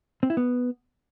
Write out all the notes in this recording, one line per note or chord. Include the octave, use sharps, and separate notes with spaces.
C4
E4
B3